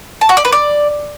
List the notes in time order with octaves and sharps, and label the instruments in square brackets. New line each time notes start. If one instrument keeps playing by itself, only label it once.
[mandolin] A5
F#4
D5
B4
D5